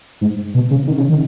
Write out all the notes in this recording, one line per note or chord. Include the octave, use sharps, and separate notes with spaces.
G#2
B2
C#3
D#3
C#3
D#3